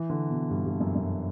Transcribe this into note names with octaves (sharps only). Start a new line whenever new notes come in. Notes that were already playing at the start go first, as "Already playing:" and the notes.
Already playing: E3
D3
B2
G2
G2
F#2
F#2